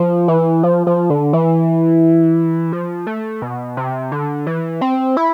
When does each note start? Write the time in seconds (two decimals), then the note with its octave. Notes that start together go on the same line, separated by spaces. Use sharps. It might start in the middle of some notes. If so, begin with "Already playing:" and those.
Already playing: F3
0.28 E3
0.63 F3
0.87 F3
1.10 D3
1.33 E3
2.72 F3
3.07 A3
3.42 B2
3.77 C3
4.12 D3
4.47 E3
4.81 C4
5.17 E4